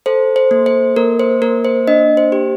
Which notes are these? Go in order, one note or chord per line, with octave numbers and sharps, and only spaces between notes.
A4 C5
C5
A#3
C5
A#3 A#4
C5
A#3 A#4
C5
D4 D#5
C5
G4